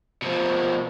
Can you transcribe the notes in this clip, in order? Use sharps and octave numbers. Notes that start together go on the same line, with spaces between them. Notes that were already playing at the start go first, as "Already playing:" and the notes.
B2 F3